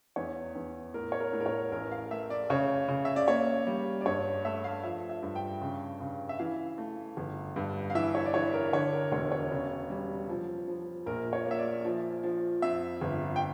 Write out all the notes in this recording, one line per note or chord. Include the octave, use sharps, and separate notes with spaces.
E2 C#5
E2
A2 A#4
C#5
A#4
A2
A#4
C#5
A1 A#4
F5
A3 E5
D5
C#3 C#5
C#3
E5
D5
A#3 C#5
G3
D5
G2 C#5
A3 E5
F5
F3 E5
E5
G2
G5
C#3
C#3
E5
E3 F5
A3
G1
G2
F5
E3 E5
C#5
D5
E3 C#5
A#4
D3 C#5
A#4
E1 C#5
C#5
C#3
G3
F3
F3
A#1 A#4
C#5
A#3
E5
D5
F3
F3
F2 E5
G1
G5